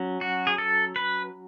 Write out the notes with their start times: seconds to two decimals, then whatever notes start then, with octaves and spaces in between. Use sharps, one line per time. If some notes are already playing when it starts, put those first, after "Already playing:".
Already playing: F#3 C#4
0.21 F#4
0.47 G#4
0.58 A4
0.96 B4